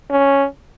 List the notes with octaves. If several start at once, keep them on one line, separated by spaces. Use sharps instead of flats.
C#4